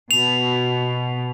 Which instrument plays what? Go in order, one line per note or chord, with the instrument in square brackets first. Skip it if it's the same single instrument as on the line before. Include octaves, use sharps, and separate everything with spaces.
[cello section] B2 [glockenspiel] F7